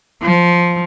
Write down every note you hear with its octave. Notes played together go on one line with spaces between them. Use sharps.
F3